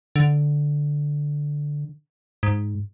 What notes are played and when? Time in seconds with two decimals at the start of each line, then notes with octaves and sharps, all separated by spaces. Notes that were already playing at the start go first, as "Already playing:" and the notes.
0.16 D3
2.43 G#2